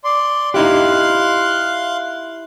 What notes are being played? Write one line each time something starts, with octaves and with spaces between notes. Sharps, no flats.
D5 C6
D#4 E4 G4 F5 C6 F#6